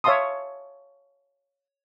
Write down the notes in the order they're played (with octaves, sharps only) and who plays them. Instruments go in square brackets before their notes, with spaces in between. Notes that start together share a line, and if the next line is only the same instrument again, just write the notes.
[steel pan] C#5 E5 F5 A5 C6 D#6